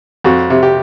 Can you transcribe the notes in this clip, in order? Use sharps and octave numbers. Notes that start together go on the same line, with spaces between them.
F2 F#4
C3
G4